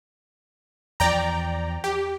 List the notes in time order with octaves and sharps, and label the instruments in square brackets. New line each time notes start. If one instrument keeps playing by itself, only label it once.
[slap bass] E2 F3 [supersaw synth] D5 G5 A#5
[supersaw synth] G4